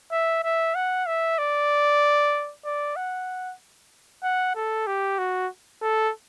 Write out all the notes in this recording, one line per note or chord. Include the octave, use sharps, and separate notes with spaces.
E5
E5
F#5
E5
D5
D5
F#5
F#5
A4
G4
F#4
A4